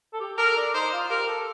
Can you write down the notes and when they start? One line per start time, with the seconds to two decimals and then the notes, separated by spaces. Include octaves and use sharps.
0.13 A4
0.20 G4
0.38 A4 A#4
0.56 D4
0.74 D#4 C5
0.93 F4
1.10 G4 A#4
1.28 A4